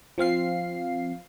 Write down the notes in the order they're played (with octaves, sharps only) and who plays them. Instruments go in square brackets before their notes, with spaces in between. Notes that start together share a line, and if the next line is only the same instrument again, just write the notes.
[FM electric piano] F3 C4 F5 C7